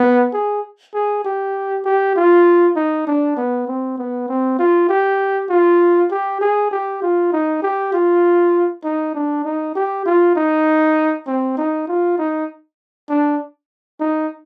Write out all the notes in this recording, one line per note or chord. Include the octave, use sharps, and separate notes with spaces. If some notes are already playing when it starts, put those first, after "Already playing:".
Already playing: B3
G#4
G#4
G4
G4
F4
D#4
D4
B3
C4
B3
C4
F4
G4
F4
G4
G#4
G4
F4
D#4
G4
F4
D#4
D4
D#4
G4
F4
D#4
C4
D#4
F4
D#4
D4
D#4